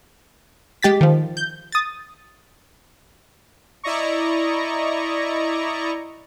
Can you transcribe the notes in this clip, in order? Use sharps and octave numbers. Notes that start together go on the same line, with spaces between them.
G#3 G4 A6 B6
D#3 F3
G6
D#6 A6
E4 D5 D#5 A#5 C#6